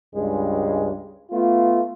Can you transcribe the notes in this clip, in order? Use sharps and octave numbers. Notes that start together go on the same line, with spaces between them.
C#2 G2 G#3
A3 B3 F4